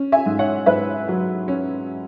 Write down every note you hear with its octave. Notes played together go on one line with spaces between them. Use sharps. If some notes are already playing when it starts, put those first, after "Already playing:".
Already playing: C#4
E5 G#5
G#2
C#5 F#5
G#2 B4 E5
F#3
C#4